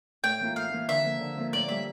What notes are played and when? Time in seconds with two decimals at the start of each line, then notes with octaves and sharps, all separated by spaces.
0.24 A2 G5
0.40 E3 A#3 F4
0.56 A2 F5
0.73 E3 A#3 F4
0.88 D3 E5
1.04 F3 A#3
1.21 D3
1.37 F3 A#3
1.53 A2 D5
1.69 G3 A#3 E5